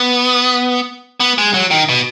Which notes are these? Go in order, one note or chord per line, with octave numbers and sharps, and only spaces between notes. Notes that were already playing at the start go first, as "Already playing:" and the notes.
Already playing: B3
B3
G#3
F#3
D#3
B2